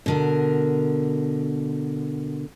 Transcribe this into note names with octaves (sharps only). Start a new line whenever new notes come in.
B2 D3 A#4